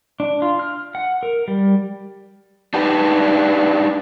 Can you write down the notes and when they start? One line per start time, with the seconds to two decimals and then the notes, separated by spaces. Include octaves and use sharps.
0.20 D4
0.42 F4
0.59 F6
0.95 F#5
1.23 A#4
1.48 G3
2.74 D4 D#4 G4 B4 D5